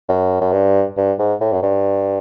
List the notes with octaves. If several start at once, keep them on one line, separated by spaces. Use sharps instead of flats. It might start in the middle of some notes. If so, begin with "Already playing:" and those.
F#2
F#2
G2
G2
G#2
A2
F#2
G2